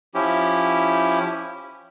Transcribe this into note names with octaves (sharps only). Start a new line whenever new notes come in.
F3 C#4 E4 G4